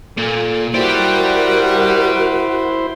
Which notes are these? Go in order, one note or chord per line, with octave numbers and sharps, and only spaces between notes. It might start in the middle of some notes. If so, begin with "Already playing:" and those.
A#2 A4
E4 F#4 G4 A#4 C5 D5